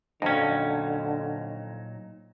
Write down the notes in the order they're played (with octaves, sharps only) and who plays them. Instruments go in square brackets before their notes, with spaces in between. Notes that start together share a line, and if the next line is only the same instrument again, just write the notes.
[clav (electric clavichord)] F2 C#4 [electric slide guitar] A#2 F#3 D#4 [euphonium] D3